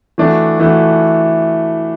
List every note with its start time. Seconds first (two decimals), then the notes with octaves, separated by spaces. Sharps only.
0.18 E3 A3 D4 F#4
0.59 E3 A3 D4 F#4